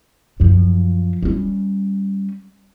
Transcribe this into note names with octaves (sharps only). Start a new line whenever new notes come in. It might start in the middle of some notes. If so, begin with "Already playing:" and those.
F#2 F3
G3 C#4